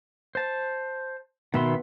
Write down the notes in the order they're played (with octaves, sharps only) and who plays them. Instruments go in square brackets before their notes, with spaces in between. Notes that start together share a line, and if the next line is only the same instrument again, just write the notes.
[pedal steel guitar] C5 A5
[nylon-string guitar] B2 [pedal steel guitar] D#3 E5 C6